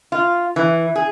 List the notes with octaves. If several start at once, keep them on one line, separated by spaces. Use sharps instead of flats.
F4
E3
G#4